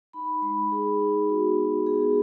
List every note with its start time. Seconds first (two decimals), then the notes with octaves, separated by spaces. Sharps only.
0.13 D#4 B5
0.42 G#3 B5
0.71 D#4 G#4
1.01 D#4
1.29 B3 F#4
1.58 F#4
1.86 B3 G#4